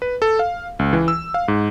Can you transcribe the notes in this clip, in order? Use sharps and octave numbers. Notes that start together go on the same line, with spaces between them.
B4
A4
F5
C#2
E3
E6
F5
G#2